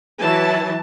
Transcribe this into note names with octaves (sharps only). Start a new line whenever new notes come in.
E3 F#3 E4 A5